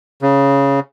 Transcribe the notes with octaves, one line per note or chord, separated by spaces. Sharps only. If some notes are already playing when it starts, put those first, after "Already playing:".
C#3